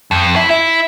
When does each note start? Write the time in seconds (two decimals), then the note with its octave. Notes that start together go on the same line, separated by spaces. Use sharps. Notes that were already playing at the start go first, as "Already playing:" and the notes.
0.11 F2
0.36 E4
0.50 E4